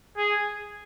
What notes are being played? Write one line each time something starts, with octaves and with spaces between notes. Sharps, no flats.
G#4